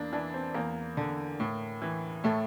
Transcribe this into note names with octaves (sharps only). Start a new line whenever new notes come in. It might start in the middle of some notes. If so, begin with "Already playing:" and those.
Already playing: E2 A#3 D4
E3 D4
C4
E2 A#3
D3
A2
E3
A2 A3